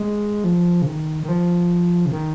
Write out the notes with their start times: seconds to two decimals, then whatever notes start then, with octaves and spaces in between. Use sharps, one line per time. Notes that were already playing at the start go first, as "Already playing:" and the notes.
Already playing: G#3
0.44 F3
0.82 C#3
0.86 D#3
1.23 D#3
1.29 F3
2.06 C#3
2.12 D#3